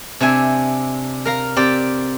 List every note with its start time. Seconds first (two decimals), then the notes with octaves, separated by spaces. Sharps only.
0.20 C3 D4 E5 G#5
1.25 A#4 F5 A#5
1.56 C4 G4 D5